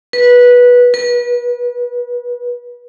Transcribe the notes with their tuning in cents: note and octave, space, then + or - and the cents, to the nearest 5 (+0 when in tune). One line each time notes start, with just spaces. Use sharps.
B4 -15
B4 -35